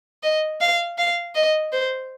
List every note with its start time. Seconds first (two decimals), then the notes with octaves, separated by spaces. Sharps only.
0.23 D#5
0.61 F5
0.98 F5
1.35 D#5
1.73 C5